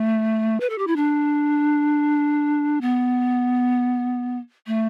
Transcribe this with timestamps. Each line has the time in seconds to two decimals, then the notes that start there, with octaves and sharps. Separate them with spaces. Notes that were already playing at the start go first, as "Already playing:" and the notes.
Already playing: A3
0.60 B4
0.70 A4
0.78 G4
0.87 E4
0.96 D4
2.81 B3
4.67 A3